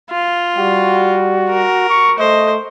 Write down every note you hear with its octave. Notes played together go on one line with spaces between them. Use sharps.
F4
G3 F#4
A#4
C#6
A3 C5 D#5